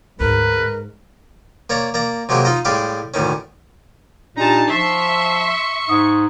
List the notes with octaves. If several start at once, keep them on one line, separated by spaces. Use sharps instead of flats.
D2 G#2 A#4 B4
A#3 C#5 D5 A#5
A#3 D5 A#5
C3 F#3 G#3 A#3 G4
D#4 F4 D#5
A2 G3 G#3 G4 F5
D2 A2 D#3 C#4
A#2 D4 D#4 G4 A5 A#5
F3 E5 C6 C#6 C7
G#2 D#6